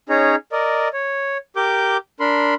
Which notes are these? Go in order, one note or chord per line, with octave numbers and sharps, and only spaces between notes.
C#4 D#4 G#4 C#5 A#5
A#4 D5 D#5
C#5
G4 A#4 D6 G6
D4 A#4 B5 C6